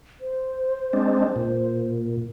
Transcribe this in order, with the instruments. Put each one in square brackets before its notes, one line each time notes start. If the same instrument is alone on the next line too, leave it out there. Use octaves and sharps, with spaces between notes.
[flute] C5
[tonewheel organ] G#3 C4 D4
A#2